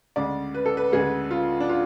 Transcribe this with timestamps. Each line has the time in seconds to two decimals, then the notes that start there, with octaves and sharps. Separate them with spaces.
0.16 D2 C#3 G#3 D5
0.54 B4
0.66 A4
0.77 B4
0.92 D2 C#3 G#3 G#4
1.31 F4
1.60 D4
1.69 F4